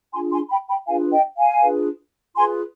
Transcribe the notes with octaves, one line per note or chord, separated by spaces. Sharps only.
D4 F4 G#4 G#5 C6
G#5 C6
G5 B5
G5 B5
D4 F4 G#4 B4 F5 G#5
D#5 G5
F5 G#5
D4 F4 G#4 B4
F4 G#4 B4 G#5 C6